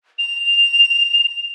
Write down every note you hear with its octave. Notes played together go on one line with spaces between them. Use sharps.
F7